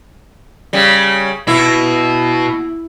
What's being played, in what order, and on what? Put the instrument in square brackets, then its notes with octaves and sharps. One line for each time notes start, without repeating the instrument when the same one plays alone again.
[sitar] C#3 G3
[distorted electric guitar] B2 [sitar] E4